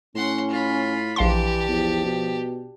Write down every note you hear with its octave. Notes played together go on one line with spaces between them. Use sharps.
A2 C#4 F#5 C6
F4 B5
A#1 E3 D4 G4 F5 C6
E2 F3
B2